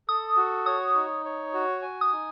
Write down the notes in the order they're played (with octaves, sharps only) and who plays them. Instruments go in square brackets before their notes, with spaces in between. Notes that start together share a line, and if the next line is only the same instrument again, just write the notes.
[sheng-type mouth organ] A4 [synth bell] D#6
[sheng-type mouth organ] F#4
[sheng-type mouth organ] C#5 [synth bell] D#6
[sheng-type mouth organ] D#4
C#5
F#4
G#5
[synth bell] D#6
[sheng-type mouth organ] D#4